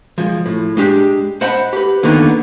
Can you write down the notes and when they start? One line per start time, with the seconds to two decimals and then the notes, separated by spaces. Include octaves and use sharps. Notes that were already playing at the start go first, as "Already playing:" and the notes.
0.18 F3 G#3
0.46 A2
0.77 G#3 D4 G4
1.41 C5 D#5 F#5 A5 B5
1.73 G4 B4
2.03 D3 D#3 A#3 B3 D#4